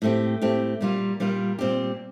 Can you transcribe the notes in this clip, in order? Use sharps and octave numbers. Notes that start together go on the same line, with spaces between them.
A2 A3 C4 G4
A2 A3 C4 G4
A#2 G3 A#3 F4
A#2 G3 A#3 F4
A#2 G3 C4 G4